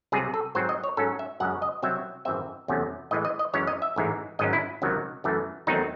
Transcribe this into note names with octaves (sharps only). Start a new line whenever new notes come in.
C2 C3 F#3 G#4
A4
G#2 F#3 C4 C5
D#5
C#5
G#2 F#3 C#4 A4
E5
F#2 C#3 G#3 C#4 F#5
D#5
C2 C3 F#3 C4 E5
G#1 F#2 E3 G#3 C4 E5
E2 C3 F#3 A3 C#4
A2 E3 G#3 D#5
D#5
D#5
F#2 E3 G#3 C#4 C#5
D#5
E5
A1 G#2 E3 G#3
G#1 G#2 F#3 C#4 D#5
E4
C#2 C3 D#3 F#3
F#2 E3 A3
E2 D#3 F#3 A3 C4 D#4